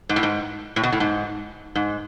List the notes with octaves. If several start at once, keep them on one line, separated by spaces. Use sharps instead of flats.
G#2
A2
G#2
A2
B2
A2
G#2
G#2